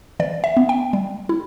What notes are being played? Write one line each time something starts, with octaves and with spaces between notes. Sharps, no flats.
E3 D5
E5
B3
G5
G3
E4